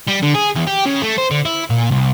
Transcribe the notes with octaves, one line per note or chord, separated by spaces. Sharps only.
G3
D3
G#4
E2
G4
C#3
A3
C5
D3
E4
A#2
C2